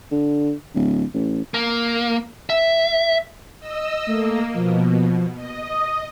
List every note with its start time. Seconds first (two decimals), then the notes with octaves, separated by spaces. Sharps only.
0.11 D3
0.74 D1
1.14 A1
1.54 A#3
2.50 E5
3.60 D#5 E6
4.07 A3 A#3
4.54 B2 F3
5.36 D#5
5.68 D#6